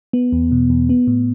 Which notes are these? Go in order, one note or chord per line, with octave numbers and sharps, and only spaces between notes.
B3
E2
B2
E2
B3
A2